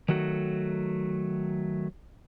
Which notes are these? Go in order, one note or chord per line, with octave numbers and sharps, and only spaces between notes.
D#3 F#3 A3 F#4